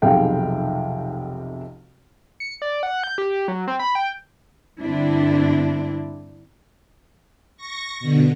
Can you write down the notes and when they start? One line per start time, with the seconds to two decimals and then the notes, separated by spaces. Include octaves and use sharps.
0.02 F1 B1 C3 G#4 F5 G5
2.40 C#7
2.62 D5
2.83 F#5
3.04 G6
3.18 G4
3.48 F#3
3.68 C4
3.80 B5
3.95 G5
4.79 G2 D3 C4 D4 E4
7.57 C#6 A#6
8.00 B2 D3